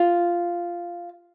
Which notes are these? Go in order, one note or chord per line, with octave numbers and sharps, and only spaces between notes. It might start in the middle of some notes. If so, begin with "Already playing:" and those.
Already playing: F4